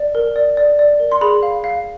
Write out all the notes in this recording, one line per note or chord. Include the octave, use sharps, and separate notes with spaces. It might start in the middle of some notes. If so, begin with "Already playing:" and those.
Already playing: D5
A#4
D5
D5
D5
A#4
C6
G#4 B5
F5
F5